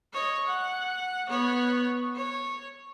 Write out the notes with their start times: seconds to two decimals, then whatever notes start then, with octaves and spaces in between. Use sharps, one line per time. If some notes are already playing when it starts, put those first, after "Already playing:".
0.13 C#5 D#5
0.47 F#5
1.29 B3 C#5
2.15 C#5